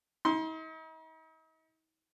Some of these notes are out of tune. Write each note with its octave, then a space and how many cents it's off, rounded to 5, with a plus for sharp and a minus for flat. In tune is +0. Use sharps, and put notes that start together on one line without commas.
D#4 +45 C6 +0